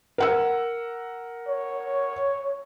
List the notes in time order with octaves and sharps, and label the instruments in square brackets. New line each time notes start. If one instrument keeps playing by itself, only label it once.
[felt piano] A#4 F#5 E6
[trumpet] C#5